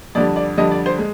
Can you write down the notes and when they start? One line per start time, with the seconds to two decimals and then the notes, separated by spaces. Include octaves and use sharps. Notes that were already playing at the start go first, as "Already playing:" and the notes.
0.15 F2 D3 G3 D5
0.36 D5
0.58 F2 D3 G3 D#5
0.71 D5
0.86 C5
0.99 G#3